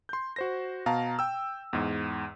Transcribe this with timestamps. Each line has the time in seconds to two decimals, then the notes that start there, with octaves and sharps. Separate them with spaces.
0.09 C6 G6
0.36 F#4 C5 A#6
0.86 B2 F5 A5 A#5
1.19 G5 E6
1.73 E2 G#2